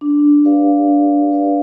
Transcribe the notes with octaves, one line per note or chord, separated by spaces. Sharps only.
D4
G4 B4 D5 F5
D4
G4 B4 D5 F5